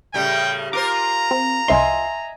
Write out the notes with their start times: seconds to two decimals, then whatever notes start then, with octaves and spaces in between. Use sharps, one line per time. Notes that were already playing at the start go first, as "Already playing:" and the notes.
0.14 A2 C#3 G3 G5
0.73 F4 A#4 C5 A#5 D6
1.31 C4
1.68 C2 D#5 E5 G#5 C6